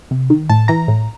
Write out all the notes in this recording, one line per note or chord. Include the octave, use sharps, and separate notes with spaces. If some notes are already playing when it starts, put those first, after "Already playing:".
C3
D#3
A2 A5
E3 A#5
A2